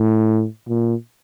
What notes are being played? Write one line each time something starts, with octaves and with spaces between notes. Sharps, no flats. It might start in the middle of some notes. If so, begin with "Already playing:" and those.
Already playing: A2
A#2